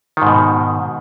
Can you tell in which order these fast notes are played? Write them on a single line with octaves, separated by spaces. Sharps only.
D#3 G#2 B2